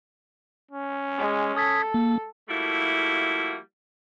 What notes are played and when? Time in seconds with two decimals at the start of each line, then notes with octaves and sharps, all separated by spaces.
0.71 C#4
1.18 G#3
1.56 A4 D#6 G#6 B6
1.94 A#3
2.49 F3 G3 A3 A#3 E4 F#4